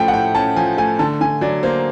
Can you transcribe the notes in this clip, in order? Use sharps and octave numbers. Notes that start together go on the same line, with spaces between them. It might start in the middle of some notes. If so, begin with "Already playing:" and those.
Already playing: A2 F3 A3 C#4 G5
F#5
A2 G5
C#4 A5
F3 G#5
A3 G#5
D3 A5
D3 G#5
F#3 D5
A#3 C5